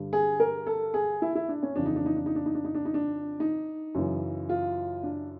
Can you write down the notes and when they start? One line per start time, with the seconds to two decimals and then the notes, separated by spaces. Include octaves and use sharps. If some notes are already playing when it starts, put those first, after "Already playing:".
Already playing: G2 D3
0.13 G#4
0.40 A#4
0.67 A4
0.94 G#4
1.22 E4
1.35 E4
1.48 D4
1.63 C#4
1.76 F2 C#3 E3 D4
1.86 D#4
1.96 D4
2.06 D#4
2.16 D4
2.26 D#4
2.36 D4
2.46 D#4
2.55 D4
2.64 D#4
2.75 D4
2.85 D#4
2.94 D4
3.40 D#4
3.95 F#2 C#3 E3
4.49 F4
5.03 D4